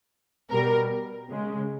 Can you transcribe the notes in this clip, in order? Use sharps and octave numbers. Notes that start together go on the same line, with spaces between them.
B2 G3 A#4
C#3 G#3